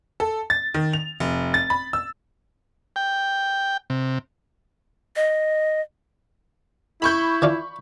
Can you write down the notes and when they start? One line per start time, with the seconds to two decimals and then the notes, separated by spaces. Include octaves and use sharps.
0.20 A4
0.50 A6
0.74 D#3
0.93 F7
1.20 F1
1.54 A6
1.70 B5
1.93 E6
2.96 G5
3.90 C3
5.16 D#5
7.02 E4 B5 C#6 G6
7.42 E3 D4 F4